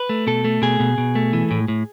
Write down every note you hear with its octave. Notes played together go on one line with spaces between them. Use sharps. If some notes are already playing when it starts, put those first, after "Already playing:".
Already playing: B4
A3
B2 A4
A3
B2 G#4
B2
B2
A3
E3
A2
A2